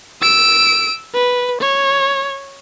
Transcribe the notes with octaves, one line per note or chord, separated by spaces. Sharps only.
E6 D7
B4
C#5